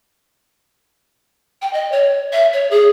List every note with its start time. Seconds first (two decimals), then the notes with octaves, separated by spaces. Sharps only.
1.62 G5
1.73 D#5
1.92 C#5
2.32 E5
2.53 C#5
2.71 G#4